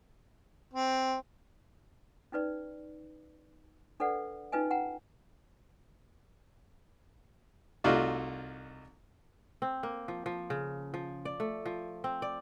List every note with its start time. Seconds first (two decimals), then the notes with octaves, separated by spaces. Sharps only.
0.74 C4
2.32 C#4 D#4 B4 D5
4.00 D4 A4 B4 D5 F#5
4.52 C#4 D#4 F4 B4 D#5 G#5
4.71 F#5 G5 A#5
7.84 C2 A3 D#4 F4 F#4 D5
9.62 C4
9.83 A#3
10.08 F3
10.26 F3
10.50 C#3
10.94 F3
11.25 D5
11.40 A3
11.66 F3
12.04 C4
12.22 D5